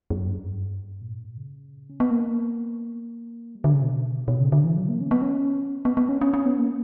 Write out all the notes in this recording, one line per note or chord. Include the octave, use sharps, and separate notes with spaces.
F#2
G2
A#2
G2
A#2
C#3
C#4
B3
A#3
G3
D3
C#3
B2
B2
C#3
D3
E3
F#3
A#3
C#4
B3
C#4
B3
B3
C#4
C#4
C#4
B3
A#3